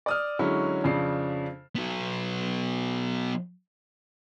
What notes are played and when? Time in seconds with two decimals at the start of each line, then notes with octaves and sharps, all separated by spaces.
0.06 D5 D#6 F6
0.39 D3 F#3 G#3 C#4 E4
0.84 F2 C#3 D4 C7
1.75 F#3 B3